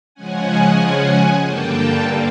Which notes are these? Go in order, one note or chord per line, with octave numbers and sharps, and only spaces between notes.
C#3 F3 G#3 C#4 F#5 G#5
G2 D3 G3 A#3 G5 A5